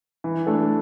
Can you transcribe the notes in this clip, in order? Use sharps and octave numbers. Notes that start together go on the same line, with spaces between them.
E3
A3 D4 A4